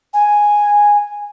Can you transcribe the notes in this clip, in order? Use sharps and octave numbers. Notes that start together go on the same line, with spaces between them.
G#5